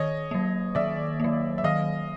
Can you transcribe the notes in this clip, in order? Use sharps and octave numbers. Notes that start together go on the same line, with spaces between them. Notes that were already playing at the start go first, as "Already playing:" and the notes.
Already playing: D#3 C#5 D#5
F#3 A#3
D#3 D5 E5
F#3 A#3
E5
D#3 D#5 F5